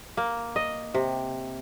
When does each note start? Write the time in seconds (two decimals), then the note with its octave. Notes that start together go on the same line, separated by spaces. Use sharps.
0.17 A#3
0.56 D#5
0.94 C3